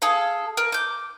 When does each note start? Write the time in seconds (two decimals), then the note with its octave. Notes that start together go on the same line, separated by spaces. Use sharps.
0.02 G#4 A4 F5
0.57 A#4
0.72 D6 G6